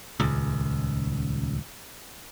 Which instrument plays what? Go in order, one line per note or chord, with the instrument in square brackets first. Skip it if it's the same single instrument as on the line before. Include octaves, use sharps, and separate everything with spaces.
[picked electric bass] D#1 C#2